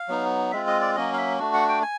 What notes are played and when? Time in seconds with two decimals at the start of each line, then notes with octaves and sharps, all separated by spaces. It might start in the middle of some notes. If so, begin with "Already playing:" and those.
Already playing: F5
0.08 F#3 B3 D#4
0.52 G#3 C4 F4 E5
0.67 D#5
0.81 D5
0.96 F#3 A#3 C#4 D#5
1.13 F5
1.18 E5
1.39 A3 D4 F#4
1.54 F#5
1.69 G5
1.82 G#5